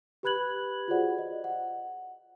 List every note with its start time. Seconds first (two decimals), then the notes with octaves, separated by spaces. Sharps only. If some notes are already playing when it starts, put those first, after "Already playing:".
0.23 G4 B4 B5 F#6 G#6 F#7
0.88 F4 F#4 G#4 C5 D5 F#5
1.18 D#5
1.44 F#5